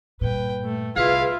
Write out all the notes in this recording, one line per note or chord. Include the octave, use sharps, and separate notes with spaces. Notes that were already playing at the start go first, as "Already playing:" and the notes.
G2 A#2 B4 G5
A3
C2 E4 F4 G#4 B4 F5